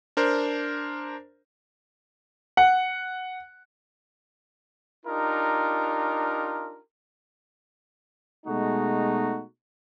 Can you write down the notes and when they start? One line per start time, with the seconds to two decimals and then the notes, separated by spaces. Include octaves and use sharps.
0.17 D4 A#4 C5
2.57 F#5
5.06 D4 D#4 F4 G4 A#4
8.46 B2 G#3 A3 D#4 F#4